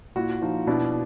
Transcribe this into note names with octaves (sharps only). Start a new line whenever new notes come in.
A#2 E4 F#4
F3 D#4 F4
B2 D4 E4